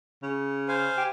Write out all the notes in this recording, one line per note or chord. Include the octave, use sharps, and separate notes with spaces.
C#3
C5 F5 G#5
G4